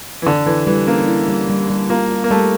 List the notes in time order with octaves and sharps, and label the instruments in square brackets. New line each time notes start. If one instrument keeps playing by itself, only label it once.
[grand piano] E3
[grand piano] D3 [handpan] A4
[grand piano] E3 [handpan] A4
[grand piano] E3 [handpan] G3
[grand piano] A#3 [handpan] C#4
[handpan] E4
G3
G3
G3
[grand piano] A#3 [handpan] F4
[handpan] F4
[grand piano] A#3
[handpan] G3 [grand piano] A3